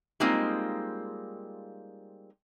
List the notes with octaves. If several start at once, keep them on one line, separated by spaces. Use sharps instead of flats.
G3 G#3 A#3 C4 D#4 F4